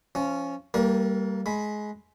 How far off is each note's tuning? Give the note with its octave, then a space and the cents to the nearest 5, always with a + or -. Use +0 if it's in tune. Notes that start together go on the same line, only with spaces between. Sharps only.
F3 -20 C#4 +0
G3 -20 A#3 -30 A#4 +40
G#3 +20 B5 +0